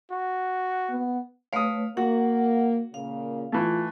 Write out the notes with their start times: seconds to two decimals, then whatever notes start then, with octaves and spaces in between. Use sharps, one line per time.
0.11 F#4
0.90 B3
1.53 A3 B4 C#5 F5 D#6
1.97 A#3 F#4 F#5
2.94 A#2 C#3 A#3 F5
3.52 E3 A3 F4